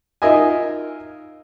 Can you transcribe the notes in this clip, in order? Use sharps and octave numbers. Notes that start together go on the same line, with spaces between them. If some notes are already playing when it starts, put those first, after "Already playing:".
D#4 F4 A#4 D#5 E5 G#5